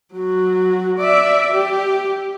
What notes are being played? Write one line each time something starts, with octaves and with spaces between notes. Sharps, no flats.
F#3 F#4
D5 E5
G4